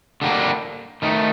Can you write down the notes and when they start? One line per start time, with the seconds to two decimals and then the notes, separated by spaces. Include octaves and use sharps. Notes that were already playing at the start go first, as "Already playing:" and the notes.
0.22 D3 G3 A#3 D4
1.02 D#3 A3 D#4